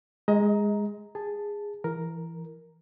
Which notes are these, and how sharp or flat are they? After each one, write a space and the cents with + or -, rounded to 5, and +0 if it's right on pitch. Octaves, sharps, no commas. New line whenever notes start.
G#3 -10 D#5 +30 A#5 +0
G#4 -15 A5 +0
E3 +15 A#4 +0